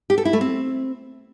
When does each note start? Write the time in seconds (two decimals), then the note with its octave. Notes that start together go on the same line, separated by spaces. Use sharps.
0.10 G4
0.18 A4
0.25 E4
0.33 A3
0.41 C4